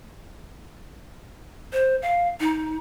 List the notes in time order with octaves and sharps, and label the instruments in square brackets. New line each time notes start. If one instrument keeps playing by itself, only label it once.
[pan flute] C5
F5
D#4